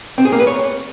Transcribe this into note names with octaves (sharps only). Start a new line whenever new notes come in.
C4
G#4
A#3
B4
C#5